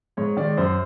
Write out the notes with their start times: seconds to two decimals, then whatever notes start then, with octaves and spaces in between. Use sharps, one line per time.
0.17 G#2 C#5
0.37 D#3 G#3 D5
0.57 F#2 C5